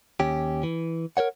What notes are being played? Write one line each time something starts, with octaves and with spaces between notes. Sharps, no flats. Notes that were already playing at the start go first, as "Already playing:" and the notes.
D#2 C#4 G4
E3
A#4 C5 C#5 F#5